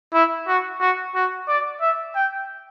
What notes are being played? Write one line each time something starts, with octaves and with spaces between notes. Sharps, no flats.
E4
F#4
F#4
F#4
D5
E5
G5